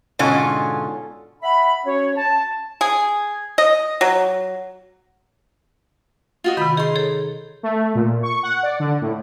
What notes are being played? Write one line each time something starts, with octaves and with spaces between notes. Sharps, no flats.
G#2 B2 D3 C#4 F4
E5 F#5 B5
C#4 F#4 C#5
A5
G#4
D#5
F#3
F4 F#4 D#5
C3 D#3 B5
D#4 G#4 C6
G#4 A4 C#5
A3
A#2
C#6
F#5
D5
D3
A2